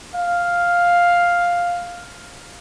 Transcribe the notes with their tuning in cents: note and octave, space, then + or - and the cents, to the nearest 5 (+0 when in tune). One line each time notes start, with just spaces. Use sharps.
F5 +5